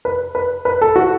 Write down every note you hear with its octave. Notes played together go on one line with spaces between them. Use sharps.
B4
B4
B4
A4
F#4